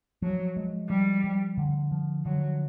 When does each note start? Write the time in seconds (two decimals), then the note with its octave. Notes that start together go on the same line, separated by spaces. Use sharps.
0.22 F3 F#3
0.57 G#3
0.89 F3 G3
1.24 F3
1.58 D3
1.91 F3
2.25 D3 F#3